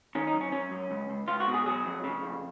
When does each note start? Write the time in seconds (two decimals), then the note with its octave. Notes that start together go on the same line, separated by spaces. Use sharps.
0.15 D#3 C#4
0.27 D#4
0.33 F#2
0.41 C#4
0.52 F#2 C#4
0.71 F#2
0.91 C#2
1.10 C#2
1.28 C#2 F4
1.40 F#4
1.47 B2
1.54 G#4
1.66 F#3 G#4
1.85 F2
2.04 C#3
2.23 F2